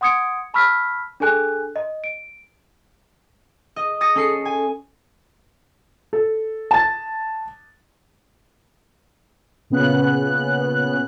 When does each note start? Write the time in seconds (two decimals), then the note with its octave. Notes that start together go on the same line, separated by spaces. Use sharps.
0.01 F#5 C6 D#6 G#6 C#7 D7
0.54 A5 B5 C#6 E6 F6 B6
1.20 D4 G#4 A4 G#5 F#6
1.76 D#5
2.04 D7
3.76 D#5
4.01 D#6 A6 A#6 C#7
4.15 C#4 A4 C7 C#7
4.45 G#5
6.13 A4
6.71 A5 A6
9.70 A#2 C#3 B3 C#4 F#6